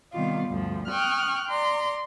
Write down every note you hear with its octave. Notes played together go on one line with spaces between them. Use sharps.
C3 D#3 G3 B3 F4
D2 G2 F3
G5 C#6 D#6 F6 F#6
D5 A#5 C6